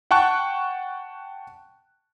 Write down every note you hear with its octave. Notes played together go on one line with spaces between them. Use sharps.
F#5 G5 A5 C#6 F#6